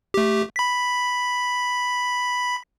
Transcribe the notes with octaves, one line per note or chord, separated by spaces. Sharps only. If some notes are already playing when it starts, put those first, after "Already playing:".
A3 G4
B5 B6